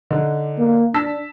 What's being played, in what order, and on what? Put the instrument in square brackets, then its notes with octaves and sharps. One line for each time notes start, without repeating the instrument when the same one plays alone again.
[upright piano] D3 D4 D#4
[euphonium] A#3
[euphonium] D4 [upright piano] A5 E6 B6